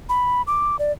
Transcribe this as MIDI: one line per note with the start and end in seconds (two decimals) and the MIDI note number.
0.09 0.42 83
0.47 0.76 86
0.79 0.92 74